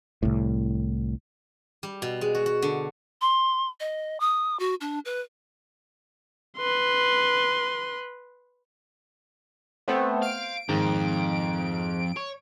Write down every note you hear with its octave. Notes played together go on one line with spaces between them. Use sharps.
C2 A2
G3
B2
G#3
F#4
F#4
D3
C6
D#5
D#6
F#4
D4
B4
B4 C6
A3 B3 C4 C5
F5 D7
F2 G#2 D#3
C#5